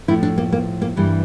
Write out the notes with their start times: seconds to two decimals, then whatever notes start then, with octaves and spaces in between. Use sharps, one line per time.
0.08 A2 F3 A3 E4
0.23 D4
0.38 A#3
0.53 A#3
0.82 A#3
0.96 G2 E3 G3 A#3